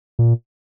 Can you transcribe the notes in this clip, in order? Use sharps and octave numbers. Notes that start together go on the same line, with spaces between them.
A#2